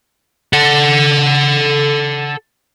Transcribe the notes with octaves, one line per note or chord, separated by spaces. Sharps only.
A4 F#5